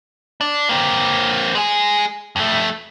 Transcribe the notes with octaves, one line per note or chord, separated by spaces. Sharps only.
D4
A#3 C4
G#3 G#4
F2 A3